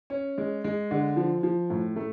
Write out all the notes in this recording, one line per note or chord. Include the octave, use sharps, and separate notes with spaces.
C#4
G#3
G#3
D3
F3
F3
A2
A3